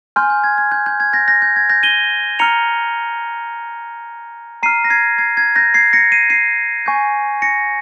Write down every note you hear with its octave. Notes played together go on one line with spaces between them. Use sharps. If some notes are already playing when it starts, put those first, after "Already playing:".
G#5 C6 F6 G6
G6
G#6
G#6
G6
G6
G#6
G6 A#6
G6 A#6
G6
G#6
G6 A#6
D#7 G7
A#5 F6 C#7 F7
A#5 F6 C7 D#7
A#6
G#6 C7
G#6 C7
G#6
G6 A#6
G#6 C7
A#6 C#7
C7 D#7
C7 D#7
G#5 C#6 G6
A#6 C#7